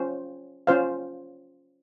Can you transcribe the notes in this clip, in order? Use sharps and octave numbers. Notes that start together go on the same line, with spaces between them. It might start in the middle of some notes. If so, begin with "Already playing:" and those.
Already playing: C#4 F4 C5
C#4 F4 C5 F5